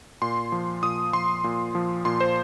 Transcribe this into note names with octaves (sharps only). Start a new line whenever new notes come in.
A#2 C6
F3
A#2 D#6
F3 C6
A#2
F3
A#2 C6
C5